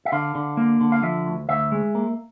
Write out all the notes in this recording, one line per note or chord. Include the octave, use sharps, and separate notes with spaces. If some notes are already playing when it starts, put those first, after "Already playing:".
E5
D3 F5
D3
A#3
D3
F5
F3 E5
D2
D2 E5
G#3
A#3